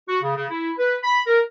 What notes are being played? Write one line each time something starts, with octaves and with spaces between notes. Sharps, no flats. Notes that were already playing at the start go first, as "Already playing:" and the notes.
F#4
C#3
C#3
E4
B4
B5
A#4